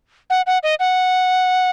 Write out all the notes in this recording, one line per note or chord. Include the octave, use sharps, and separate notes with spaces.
F#5
F#5
D#5
F#5